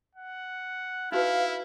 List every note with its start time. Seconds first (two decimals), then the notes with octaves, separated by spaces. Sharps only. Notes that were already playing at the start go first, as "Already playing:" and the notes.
0.15 F#5
1.12 D#4 E4 F#4 B4 F5 F6